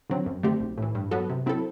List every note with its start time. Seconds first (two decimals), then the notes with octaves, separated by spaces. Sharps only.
0.10 D3 F#3 C4
0.26 F#2
0.43 D3 A3 C4 G4
0.60 B1
0.78 A2 E3
0.95 G2
1.11 F#3 B3 F#4 A4
1.30 C3
1.46 F#3 C4 E4 A4